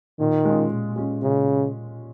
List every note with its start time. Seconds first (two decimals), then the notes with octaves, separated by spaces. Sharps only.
0.19 A#2 D#3
0.45 G#3 C#4 F4
0.71 A#2
0.96 G#3 C#4 F4
1.22 A#2 C#3